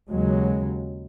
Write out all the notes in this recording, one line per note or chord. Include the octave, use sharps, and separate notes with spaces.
D#2 C#3 F#3 G#3